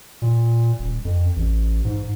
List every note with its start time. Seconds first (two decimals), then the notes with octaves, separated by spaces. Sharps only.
0.22 A#2
0.79 D#1
1.05 F2
1.36 A1
1.85 G#2